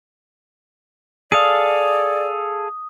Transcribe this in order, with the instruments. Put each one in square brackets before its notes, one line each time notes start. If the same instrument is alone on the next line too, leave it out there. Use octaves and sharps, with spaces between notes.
[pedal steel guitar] G#4 A4 F5 [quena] D5 [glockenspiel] D#6